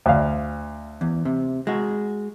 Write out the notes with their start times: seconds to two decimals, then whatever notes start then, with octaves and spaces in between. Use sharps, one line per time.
0.06 D2 F5
1.01 E2
1.25 C3
1.67 G#3 F#4